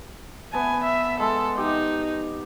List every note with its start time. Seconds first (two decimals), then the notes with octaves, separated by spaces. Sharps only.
0.53 B3 G#5 A5
0.84 E5
1.20 G#3 A4
1.58 D#4 G4